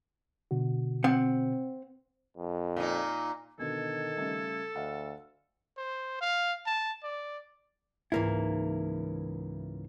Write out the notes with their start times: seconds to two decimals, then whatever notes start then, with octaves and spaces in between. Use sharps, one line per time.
0.51 B2 D3 F#4
1.04 C4 F#5
2.37 F2
2.76 A#2 D#4
3.59 B2 D3 D#3 A4 G#6
4.17 C#3 G3 A3
4.76 D2 D#5 F5 F#5
5.77 C5
6.21 F5
6.66 A5
7.04 D5
8.12 C#2 G#2 E3 A#3 E4